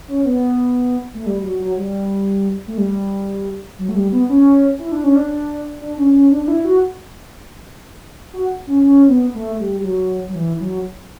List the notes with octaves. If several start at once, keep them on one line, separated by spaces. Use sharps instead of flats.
C#4
B3
A3
G3
F#3
F#3
G3
A3
G3
F#3
A3
G3
B3
C#4
E4
D4
C#4
D4
D4
C#4
C#4
D4
D4
E4
F#4
F#4
C#4
C#4
B3
A3
G3
G3
F#3
F#3
E3
F#3